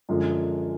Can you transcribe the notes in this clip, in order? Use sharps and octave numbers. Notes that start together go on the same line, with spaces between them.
F#2 D3 F3 G#3